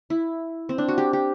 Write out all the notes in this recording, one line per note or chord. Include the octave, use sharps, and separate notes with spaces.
E4
C4
D4
F#4
G4
G4